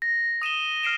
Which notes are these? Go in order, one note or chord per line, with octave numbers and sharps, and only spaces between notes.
A#6
D#6 D#7 E7 G7
F6 C7 D7 E7